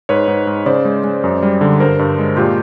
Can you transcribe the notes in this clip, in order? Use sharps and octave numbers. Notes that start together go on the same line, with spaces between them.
G#2 B4 C#5
G#2
G#2
C#3 C5 D5
G#3
G#3
F#2
G3
D3
G2 A#4 C5
G2
G#3
A#2 F4 G4